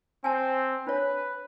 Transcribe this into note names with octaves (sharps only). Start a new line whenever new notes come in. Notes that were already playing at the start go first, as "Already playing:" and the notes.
C4 G#5 A5
D4 B4 C#5